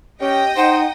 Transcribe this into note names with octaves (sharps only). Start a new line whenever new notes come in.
C#4 G4 D#5 G5 D#6
D#4 C5 F#5